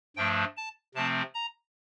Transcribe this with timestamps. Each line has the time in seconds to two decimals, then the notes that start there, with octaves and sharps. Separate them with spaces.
0.17 G2 F3 A3 D4 G5
0.57 A5
0.95 C3 F3 A3 C4 A5
1.34 A#5